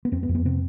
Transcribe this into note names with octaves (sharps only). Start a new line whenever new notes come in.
B3
F2 C4
B3
F2
B3
C3 C4